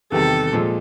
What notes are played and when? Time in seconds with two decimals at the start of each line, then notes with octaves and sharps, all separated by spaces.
0.12 E2 C3 D#3 G3 A4
0.53 A#2 F3 G#3